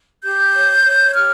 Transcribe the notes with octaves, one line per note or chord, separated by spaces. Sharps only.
G4 G6
C#5
C#5
G4 F6